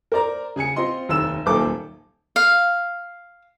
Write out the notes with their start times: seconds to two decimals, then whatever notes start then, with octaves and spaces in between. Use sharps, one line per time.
0.12 A#4 C5 D5 A#5
0.56 C#3 G#4 G#5 C#7
0.76 C4 F4 D#5 C6
1.09 F1 D#2 E6 E7
1.46 D#1 B1 A#3 A4 D6
2.36 F5